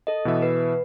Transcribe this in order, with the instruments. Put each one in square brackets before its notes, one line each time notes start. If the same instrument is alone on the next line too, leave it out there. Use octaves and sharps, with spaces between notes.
[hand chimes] A4 D#5
[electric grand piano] B2 E3 E5
[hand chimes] B4